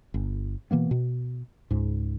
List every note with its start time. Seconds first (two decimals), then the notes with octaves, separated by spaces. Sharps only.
0.14 G1
0.71 B2 E3 A#3 B3
0.91 B2
1.71 C#2 G#2